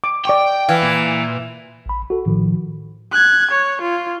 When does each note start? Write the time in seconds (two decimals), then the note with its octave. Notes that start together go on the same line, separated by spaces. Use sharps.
0.04 D6
0.25 D5 G5 C#6 D6
0.69 E3 F5
0.83 A#2
1.86 A1 B5
2.10 F#4 A4
2.26 A2 D#3 F3
3.12 F#6 G#6
3.51 C#5
3.82 F4